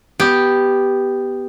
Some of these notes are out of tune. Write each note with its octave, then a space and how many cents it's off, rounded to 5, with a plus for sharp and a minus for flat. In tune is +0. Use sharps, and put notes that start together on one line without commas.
B3 +0 G4 +0